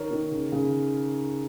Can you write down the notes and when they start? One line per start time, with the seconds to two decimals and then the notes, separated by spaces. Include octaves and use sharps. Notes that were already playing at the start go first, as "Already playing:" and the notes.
Already playing: D#3 A#4 C#5
0.11 D#3
0.31 C#3
0.52 C#3